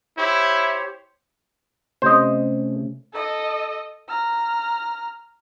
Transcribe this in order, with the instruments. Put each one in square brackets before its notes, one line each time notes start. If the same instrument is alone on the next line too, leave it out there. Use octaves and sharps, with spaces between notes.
[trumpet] E4 [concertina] G4 C5 C#5
[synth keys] C3 A3 C#4 [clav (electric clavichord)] C5 D#5
[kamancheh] A4 D#5
A#5 F6